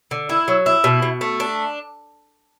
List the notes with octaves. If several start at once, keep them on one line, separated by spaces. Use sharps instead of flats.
D3
E4
F#3
E4
B2
B2
A3
D4